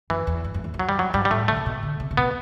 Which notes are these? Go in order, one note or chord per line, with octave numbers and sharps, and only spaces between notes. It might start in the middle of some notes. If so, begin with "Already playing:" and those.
F#2 E3
E2
G2
F#2
E2
F#2
F#3
G3
F#3
G2 G3
G3
A2 A3
D3 A3
C3
B2
D3
C3
C3
B2 B3